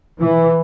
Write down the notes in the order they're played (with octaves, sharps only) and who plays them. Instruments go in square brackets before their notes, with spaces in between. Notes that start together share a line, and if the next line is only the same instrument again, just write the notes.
[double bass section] E3